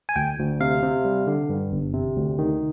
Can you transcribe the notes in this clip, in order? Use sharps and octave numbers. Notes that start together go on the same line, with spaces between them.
G#5
D2 G5
D2
C3 F5
C3
G3
D3
G2
G1
C3
D2
D#3